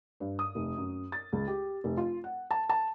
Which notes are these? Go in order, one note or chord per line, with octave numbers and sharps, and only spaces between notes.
G2
D#6
F1
F#2
A6
C#2
G4
F1
F4
F#5
A5
A5